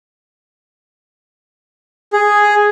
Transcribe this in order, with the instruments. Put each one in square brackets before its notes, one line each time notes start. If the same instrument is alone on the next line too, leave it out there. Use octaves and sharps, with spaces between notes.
[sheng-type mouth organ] G#4